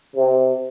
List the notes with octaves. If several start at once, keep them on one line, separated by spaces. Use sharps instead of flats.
C3